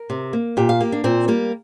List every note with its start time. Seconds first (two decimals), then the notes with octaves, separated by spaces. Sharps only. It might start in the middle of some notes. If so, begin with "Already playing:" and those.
Already playing: A#4
0.10 C3
0.33 A#3
0.57 A#2 G4
0.69 F5
0.80 A#3 G4
0.92 D4
1.04 A#2 C4
1.28 G3 A#3